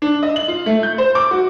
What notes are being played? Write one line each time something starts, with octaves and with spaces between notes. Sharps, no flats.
D4
D#5
F#7
F4
A3
G6
C5
D6
F#4